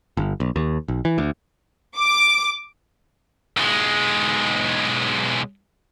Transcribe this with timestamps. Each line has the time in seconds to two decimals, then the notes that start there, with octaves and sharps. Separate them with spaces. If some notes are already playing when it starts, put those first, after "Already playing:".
0.17 G1
0.40 B1
0.56 D#2
0.88 B1
1.05 E3
1.18 D2
1.96 D6
3.57 B1 G#3